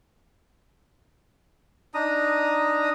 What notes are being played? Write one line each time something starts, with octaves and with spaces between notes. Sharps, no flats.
D4 D#4 A#5 D#6